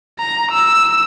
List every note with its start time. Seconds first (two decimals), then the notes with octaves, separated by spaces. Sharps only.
0.19 A#5
0.51 E6